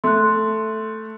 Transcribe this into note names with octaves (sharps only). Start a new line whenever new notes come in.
A3 C6 F#6